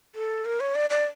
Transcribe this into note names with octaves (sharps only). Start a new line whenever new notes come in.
A4
A#4
C#5
D5
D5